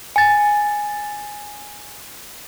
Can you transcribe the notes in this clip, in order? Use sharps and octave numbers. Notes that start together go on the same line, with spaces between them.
G#5 A6